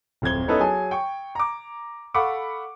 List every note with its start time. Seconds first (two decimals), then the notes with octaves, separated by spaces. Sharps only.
0.22 D1 F2 C5 G#6 G7
0.48 B3 C#4 D#4 E4 A4 B4
0.60 F#3 G#4 G#5 A5
0.91 G5 C#6
1.35 A#5 D6
2.14 A4 F5 F#5 B5 C#6 D6